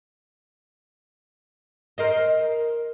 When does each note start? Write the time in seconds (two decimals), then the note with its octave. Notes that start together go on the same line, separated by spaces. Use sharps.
1.98 A#4 C5 D#5